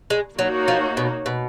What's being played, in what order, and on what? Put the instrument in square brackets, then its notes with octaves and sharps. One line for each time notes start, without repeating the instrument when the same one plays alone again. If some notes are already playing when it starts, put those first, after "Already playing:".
[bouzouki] G#3
[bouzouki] F#3 [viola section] A#3 D#4 F#4 C#5
[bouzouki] F3
B2
B2